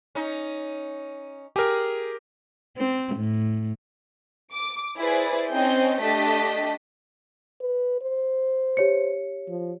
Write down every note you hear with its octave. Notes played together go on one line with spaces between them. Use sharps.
C#4 D#4
G4 G#4 A#4
C4
A2
D6 D7
E4 G#4 B4 C5 D5
C4 C#4 D#4 D#5 G5 G6
A3 D4 G4 D#5 A5 B6
B4
C5
G4 C#5 C#7
F3